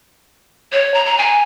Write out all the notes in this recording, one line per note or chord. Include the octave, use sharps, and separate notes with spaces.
C#5
A#5
A#5
G#5